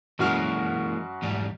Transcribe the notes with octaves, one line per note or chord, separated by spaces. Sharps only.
F#2 E3 G#3 A#3 F#4 F6
E2 G#2 G3